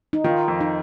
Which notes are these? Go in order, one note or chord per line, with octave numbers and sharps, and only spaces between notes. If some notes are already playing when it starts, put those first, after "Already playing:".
D#4
D#3 F4
F2
D#4